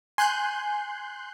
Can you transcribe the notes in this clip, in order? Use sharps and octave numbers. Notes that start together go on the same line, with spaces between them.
G#5 C6 F#6 G6